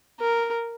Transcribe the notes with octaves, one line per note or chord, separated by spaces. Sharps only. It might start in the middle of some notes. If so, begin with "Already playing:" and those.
A#4